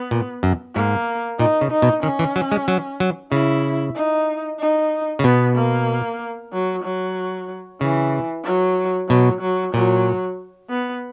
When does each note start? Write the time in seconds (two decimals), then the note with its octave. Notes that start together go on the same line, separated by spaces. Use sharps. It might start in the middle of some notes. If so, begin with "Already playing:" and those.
Already playing: B3
0.11 A#2
0.43 F#2
0.75 G#2 A#3
1.39 A#2 D#4
1.61 C#3
1.71 D#4
1.82 B2
2.03 D#3 C#4
2.19 E3
2.36 F#3
2.52 G#3
2.68 F#3
3.00 F#3
3.32 C#3 E4
3.96 D#4
4.60 D#4
5.19 C#3
5.24 B2 B3
5.56 A#3
6.53 F#3
6.84 F#3
7.81 C#3 E3
8.45 F#3
9.09 B2 F#3
9.41 F#3
9.74 A#2 F#3
10.70 B3